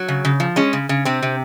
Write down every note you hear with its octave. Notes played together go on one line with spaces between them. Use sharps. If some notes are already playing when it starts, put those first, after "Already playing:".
Already playing: F#3
C#3
C#3
F3
G#3 C#4
C#3
C#3
C3 C4
C3